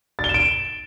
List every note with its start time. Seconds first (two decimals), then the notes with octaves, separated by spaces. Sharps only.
0.19 A6
0.24 G7
0.29 E7
0.34 D7
0.40 E7